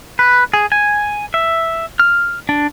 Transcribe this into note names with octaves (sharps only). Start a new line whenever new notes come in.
B4
G#4
G#5
E5
F6
D4